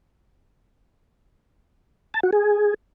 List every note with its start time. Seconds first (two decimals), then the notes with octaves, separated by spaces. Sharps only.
2.14 A5
2.23 F#4
2.33 G#4